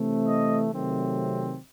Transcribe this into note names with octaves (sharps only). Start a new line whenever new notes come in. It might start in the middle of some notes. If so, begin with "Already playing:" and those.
Already playing: C3 E3 A3 C4
D#5
C3 D#3 F#3 A3 C4